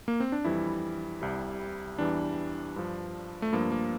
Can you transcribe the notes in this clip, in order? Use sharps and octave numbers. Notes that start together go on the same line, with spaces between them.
A#3
C4
D4
F2 E3 G3 E4
C2 C3 G3
E2 E3 G3 D4
G2 F3
A3
G2 F3 A#3
A#3